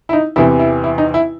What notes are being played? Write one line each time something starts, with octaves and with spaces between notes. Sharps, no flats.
E4
D#4
E2 C3 E3 E4
E4
E4
D#4
E4